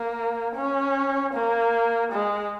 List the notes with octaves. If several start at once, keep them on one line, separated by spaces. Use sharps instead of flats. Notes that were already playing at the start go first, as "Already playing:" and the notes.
Already playing: A#3
C#4
A#3
G#3